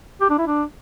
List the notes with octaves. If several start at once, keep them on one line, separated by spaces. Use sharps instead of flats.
G4
D4
E4
D4